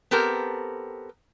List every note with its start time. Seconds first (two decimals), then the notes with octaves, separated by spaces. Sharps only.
0.11 B3 C4 G4 A4 A#4